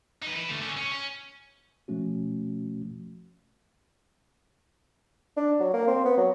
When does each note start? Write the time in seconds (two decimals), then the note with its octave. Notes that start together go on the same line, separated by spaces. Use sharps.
0.23 D#4 B4
0.36 E4 B4
0.49 D3 A3
0.62 D3 C#4
0.77 C#4
0.92 C#4
1.88 B2 F3 A3 C#4 F#4
5.37 D4
5.60 F#3
5.73 A#3
5.87 C4
6.05 B3
6.17 F#3